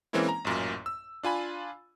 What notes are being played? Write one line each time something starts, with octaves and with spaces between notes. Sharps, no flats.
E3 G#3 A#3 C4 C#4 E4
A#5
A1 F#2 A#2
E6
D4 F4 G#5 B5